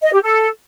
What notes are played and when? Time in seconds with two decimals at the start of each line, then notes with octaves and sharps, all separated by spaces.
0.02 D#5
0.12 G4
0.22 A4